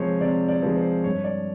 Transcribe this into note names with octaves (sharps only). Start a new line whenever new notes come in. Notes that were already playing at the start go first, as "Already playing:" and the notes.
Already playing: C3 F3 G#3 C5 C#5
C3 D5
D5
F3 G#3
C5
G2 C#5
D5